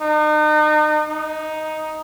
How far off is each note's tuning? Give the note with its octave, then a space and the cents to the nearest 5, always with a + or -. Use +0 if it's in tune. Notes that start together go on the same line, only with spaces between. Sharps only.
D#4 -40
D#4 +5